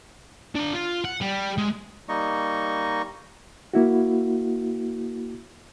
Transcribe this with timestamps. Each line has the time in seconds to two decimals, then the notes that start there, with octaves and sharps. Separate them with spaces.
0.55 D4 A#5
0.73 F4
1.05 F#5
1.21 G3
1.58 G#3
2.09 G3 A#3 D#4 D#5 C#6
3.74 A#3 E4 F#4